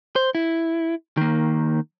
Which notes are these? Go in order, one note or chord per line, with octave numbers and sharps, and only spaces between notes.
C5
E4
D#3 A#3